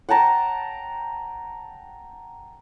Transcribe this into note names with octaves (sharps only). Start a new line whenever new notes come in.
F#5 G5 A5 A#5